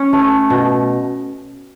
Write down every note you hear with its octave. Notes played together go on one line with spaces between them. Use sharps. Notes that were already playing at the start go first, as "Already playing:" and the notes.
Already playing: C#4
A3
B2